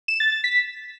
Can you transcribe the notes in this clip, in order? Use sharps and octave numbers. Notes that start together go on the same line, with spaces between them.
E7
A6
A6
B6